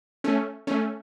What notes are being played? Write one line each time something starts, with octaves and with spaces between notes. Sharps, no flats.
A3 C#4
A3 C#4